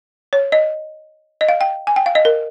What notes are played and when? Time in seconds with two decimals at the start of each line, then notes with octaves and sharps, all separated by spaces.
0.33 C#5
0.52 D#5
1.41 D#5
1.48 F5
1.61 G5
1.87 G#5
1.96 G5
2.06 F5
2.15 D#5
2.25 A#4